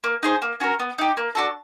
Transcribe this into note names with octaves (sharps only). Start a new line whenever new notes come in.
A#3
D#4 G#4 C5
A#3
C#4 F#4 A#4
B3
D#4 G4
A#3
D4 F#4 A4